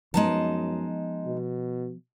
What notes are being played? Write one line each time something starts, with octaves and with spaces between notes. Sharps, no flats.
F#2 F3 G#3 B3 D#4 A5
B2